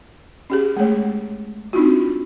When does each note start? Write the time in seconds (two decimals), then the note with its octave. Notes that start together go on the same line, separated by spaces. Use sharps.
0.50 C#4 G4 G#4
0.77 G#3 A3 G#4 C#5
1.73 C4 D4 D#4 F4 F#4